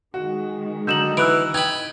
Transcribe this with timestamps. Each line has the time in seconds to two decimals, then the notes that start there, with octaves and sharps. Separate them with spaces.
0.14 D#3 G#3 F#4
0.87 D3 F#3 D#4 G6 E7 F#7
1.17 E3 E6 F#6 D7
1.54 D#4 G5 B5 G#6